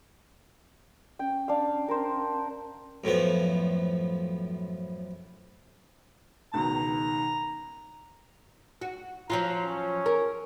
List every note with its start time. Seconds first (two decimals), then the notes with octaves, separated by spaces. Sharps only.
1.19 C#4 G5
1.48 D4 F5
1.88 A#4 C5
3.04 F#2 A2 F3 B3
6.54 C#2 B2 D#3 A#5
8.81 F#4
9.30 F3 F#3 F4 A#5
9.64 C#4
10.06 A#4